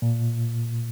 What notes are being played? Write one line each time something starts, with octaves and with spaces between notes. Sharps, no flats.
A#2